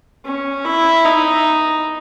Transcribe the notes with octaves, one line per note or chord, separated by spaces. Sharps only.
C#4
E4
D#4